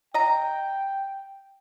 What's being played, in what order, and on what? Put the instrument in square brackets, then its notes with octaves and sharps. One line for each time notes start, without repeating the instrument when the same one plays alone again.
[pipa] D#5 A#5 [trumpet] G5